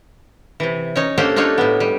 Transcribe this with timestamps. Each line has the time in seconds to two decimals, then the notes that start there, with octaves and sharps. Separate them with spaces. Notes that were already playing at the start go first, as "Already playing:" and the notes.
0.60 C3 E3
0.96 C#4 D#4 C#5
1.18 A#3 C#4 D4 G4 A4 C5
1.36 D4 D#4 F4 A4 C#5
1.58 A2 B3
1.80 G3